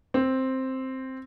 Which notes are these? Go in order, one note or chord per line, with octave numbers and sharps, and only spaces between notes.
C4